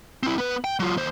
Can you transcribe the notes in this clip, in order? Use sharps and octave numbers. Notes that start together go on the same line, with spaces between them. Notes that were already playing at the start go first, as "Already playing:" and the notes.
C4 E4
B3 B4
G5
F#3 F4
D#2 C5